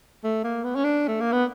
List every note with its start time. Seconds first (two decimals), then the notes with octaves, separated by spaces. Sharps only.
0.24 A3
0.44 A#3
0.64 B3
0.75 C#4
0.84 D4
1.08 A3
1.21 A#3
1.33 B3